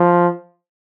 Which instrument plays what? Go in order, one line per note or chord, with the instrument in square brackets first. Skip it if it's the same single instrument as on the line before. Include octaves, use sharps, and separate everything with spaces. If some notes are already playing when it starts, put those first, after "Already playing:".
Already playing: [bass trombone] F3